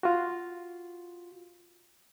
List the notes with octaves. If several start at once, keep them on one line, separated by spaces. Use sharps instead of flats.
F4 F#4